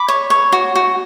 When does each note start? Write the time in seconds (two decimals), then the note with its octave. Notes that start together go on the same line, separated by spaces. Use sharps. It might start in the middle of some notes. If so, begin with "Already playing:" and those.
Already playing: B5 D6
0.08 C#5
0.30 C#5
0.52 F#4
0.75 F#4